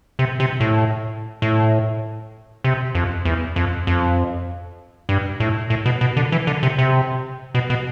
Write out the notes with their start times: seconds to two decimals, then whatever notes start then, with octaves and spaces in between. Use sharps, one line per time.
0.19 C3
0.40 C3
0.60 A2
1.42 A2
2.64 C3
2.95 F2
3.25 E2
3.56 F2
3.87 F2
5.09 G2
5.40 A2
5.70 A2
5.86 B2
6.01 B2
6.17 D3
6.32 E3
6.47 D3
6.63 C3
6.78 C3
7.55 B2
7.70 B2